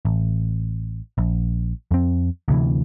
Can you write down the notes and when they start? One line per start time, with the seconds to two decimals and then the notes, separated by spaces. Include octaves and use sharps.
0.05 A1
1.18 A#1
1.91 F2 C4
2.48 D2 C3 E3